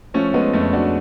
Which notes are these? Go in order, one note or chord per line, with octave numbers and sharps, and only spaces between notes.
F3 A3 C#4
G#3 B3
F2 A3 C#4
D4 F#4